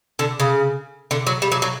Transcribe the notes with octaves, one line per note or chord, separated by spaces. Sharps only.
D3
C#3
D3
F#3
G3
F#3
F#3